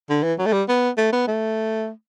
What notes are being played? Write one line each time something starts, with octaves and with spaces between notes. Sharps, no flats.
D3
E3
F#3
A3
G3
B3
A3
B3
A3